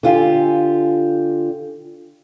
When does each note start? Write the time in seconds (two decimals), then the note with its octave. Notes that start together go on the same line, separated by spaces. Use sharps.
0.03 D3 F4 G4 G#5